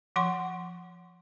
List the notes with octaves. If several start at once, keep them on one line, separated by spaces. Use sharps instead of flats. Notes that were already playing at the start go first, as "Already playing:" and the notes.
F3 F#5 C6 C#6